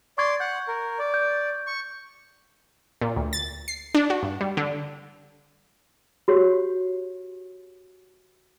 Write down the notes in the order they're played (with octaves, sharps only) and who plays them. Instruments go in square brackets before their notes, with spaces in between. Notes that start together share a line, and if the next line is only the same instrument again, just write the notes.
[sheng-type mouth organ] D5 C6 [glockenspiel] C#6 G#6
[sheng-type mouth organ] F#5 [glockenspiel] G6
[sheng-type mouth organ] A#4
D5
[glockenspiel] G6
[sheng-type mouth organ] C#6
[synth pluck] A#2
D2
A6
C7
D4
F#4
G2
G3
D3
[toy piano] F#4 G4 C#5